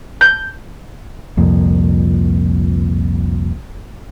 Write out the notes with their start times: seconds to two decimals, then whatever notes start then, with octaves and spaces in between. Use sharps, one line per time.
0.21 G6
1.37 C2 F2 A#2